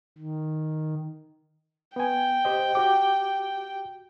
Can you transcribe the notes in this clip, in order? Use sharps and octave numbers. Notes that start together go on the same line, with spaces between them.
D#3
B3 G5 G#5
G4 C5 D#5
F#4 G4 D6